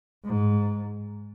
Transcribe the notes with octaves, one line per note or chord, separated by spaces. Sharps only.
G#2